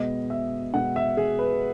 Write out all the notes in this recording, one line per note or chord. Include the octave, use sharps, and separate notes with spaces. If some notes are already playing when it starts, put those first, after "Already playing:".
Already playing: B2 G#3 B3 D#5
E5
B2 G#3 B3 F#5
E5
G#4
B4